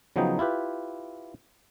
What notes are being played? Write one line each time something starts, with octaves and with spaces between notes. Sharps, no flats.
C#3 F3 F#3 B3 D#4 G5
E4 F4 G4 B4